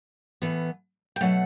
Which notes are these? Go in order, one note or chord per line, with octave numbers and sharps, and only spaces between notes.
A2 E3 B3
G5
B2 F#3 A3 F#5